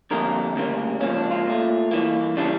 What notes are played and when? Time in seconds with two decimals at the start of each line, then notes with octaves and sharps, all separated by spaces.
0.11 F2 D3 G3 A#3 A#4
0.56 D2 C#3 G3 A#3
1.00 C#2 C#3 F3 A#3 C#4
1.16 D4
1.31 F4
1.46 A#2 A3
1.91 G2 E3 A#3
2.37 C#3 E3 G3 D4